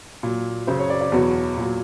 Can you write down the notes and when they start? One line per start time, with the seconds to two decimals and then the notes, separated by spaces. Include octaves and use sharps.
0.23 A#2 F#3
0.67 F#2 C#3 F#3 C5
0.79 C#5
0.90 D5
1.01 D5
1.12 E2 B2 F#3 C#5
1.57 A#2 F#3